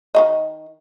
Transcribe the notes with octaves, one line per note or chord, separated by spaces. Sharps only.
D#3 A3 D#5